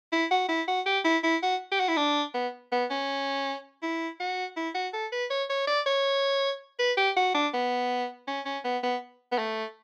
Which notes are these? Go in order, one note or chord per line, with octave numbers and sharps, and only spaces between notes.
E4
F#4
E4
F#4
G4
E4
E4
F#4
G4
F#4
E4
D4
B3
B3
C#4
E4
F#4
E4
F#4
A4
B4
C#5
C#5
D5
C#5
B4
G4
F#4
D4
B3
C#4
C#4
B3
B3
B3
A3